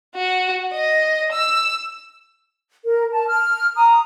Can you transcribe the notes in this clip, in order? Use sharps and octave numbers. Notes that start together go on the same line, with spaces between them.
F#4
D#5
E6
A#4
A5
F6
A#5 D#6